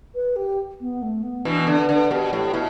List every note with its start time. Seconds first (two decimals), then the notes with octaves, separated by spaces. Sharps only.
0.15 B4
0.36 G4
0.80 B3
1.02 A3
1.23 B3
1.45 B2 E3 D4
1.61 B3
1.67 D3
1.78 B4
1.89 D3
1.94 B4
2.10 B2 G4
2.32 A2 G4
2.53 B2 E4